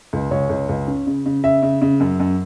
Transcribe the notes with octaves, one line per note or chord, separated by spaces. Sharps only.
C#2
C#2 C#5
C#2
C#2
C#4
C#3
C#3
C#3 E5
C#3
C#3
F#2
F#2